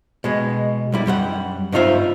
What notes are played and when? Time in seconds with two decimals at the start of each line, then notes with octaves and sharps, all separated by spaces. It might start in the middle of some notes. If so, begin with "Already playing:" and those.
0.24 B2 G#3
0.92 B1 G3 E4
1.06 F#2 G3 C5 F#5
1.72 G2 B3 D#4 F4 C5 E5